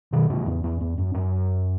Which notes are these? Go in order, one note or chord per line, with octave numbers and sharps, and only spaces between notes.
B2 D#3
A2 C#3
E2
E2
E2
F#2
F#2